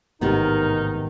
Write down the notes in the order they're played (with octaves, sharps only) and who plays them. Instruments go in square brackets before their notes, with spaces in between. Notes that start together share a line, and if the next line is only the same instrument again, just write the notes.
[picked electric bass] A1 G#2 [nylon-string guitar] C3 D#3 B3 [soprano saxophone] D#4 [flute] A#4